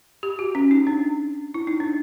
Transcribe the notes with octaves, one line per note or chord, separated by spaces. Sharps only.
G4
F#4
C#4
D#4
D4
E4
D#4
D4